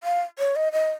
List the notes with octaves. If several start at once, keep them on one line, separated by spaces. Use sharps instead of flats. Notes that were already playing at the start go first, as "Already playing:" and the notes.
F5
C#5
D#5
D#5